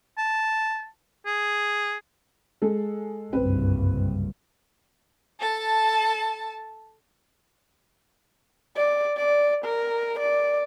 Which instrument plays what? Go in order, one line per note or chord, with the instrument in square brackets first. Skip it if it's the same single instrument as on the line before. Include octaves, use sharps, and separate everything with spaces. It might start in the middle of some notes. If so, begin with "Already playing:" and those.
[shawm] A5
G#4
[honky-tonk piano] G#3 A4
[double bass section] F#1 C2 G2 [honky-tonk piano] C4 B4
[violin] A4 A5
[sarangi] D5
D5
A#4
D5